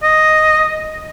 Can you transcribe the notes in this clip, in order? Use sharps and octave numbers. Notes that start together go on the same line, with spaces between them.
D#5